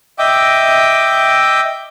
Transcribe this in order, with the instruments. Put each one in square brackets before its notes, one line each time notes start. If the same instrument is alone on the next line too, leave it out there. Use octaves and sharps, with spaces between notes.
[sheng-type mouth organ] D#5 E5 G5 D6